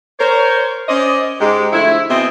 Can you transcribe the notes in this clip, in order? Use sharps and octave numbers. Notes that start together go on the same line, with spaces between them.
A#4 C5 C#5
C#4 C5 D5 D#5
G#2 G#3 G4
D3 F3 A3 E4
B2 C4 G#4 C5 D#5 E5